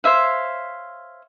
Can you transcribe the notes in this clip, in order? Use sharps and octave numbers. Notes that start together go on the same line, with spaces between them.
C5 C#5 E5 F5